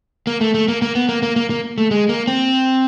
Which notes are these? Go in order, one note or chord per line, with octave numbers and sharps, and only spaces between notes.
A#3
A3
A3
A#3
A#3
B3
A#3
A#3
A#3
A#3
A3
G#3
A#3
C4